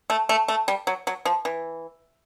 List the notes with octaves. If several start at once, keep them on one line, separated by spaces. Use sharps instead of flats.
A3
A3
A3
G3
F#3
F#3
F3
E3